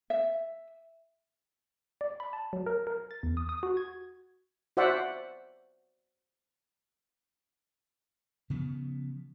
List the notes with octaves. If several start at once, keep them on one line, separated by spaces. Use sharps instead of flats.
E5
D5
B5
A5
F#3
A#4
A#4
A6
E2
D#6
D#6
F#4
G#6
F#4 C5 D5 E5 F#5
C#3 F3 B3